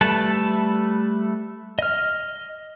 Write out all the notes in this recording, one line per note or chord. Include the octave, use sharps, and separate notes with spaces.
G3 A3 A4 B4 A5
D#5 F6